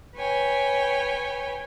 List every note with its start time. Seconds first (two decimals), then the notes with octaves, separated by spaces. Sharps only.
0.17 B4 C#5 G5 G#5